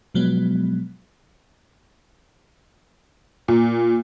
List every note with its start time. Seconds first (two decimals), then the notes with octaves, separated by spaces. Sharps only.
0.14 B2 F3 F#3 G#3 B3
3.48 A#2